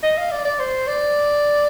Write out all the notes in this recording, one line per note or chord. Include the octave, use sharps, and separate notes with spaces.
D#5
F5
D5
D5
C5
D5